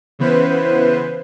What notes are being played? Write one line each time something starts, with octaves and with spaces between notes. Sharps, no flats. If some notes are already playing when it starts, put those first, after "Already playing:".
C#3 E3 B3 B4 C5